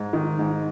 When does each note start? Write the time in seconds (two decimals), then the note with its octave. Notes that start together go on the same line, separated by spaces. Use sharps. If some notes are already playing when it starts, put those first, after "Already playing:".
Already playing: G#2
0.13 D#3
0.39 G#2